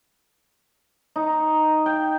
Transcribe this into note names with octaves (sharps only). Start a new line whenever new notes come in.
D#4
G5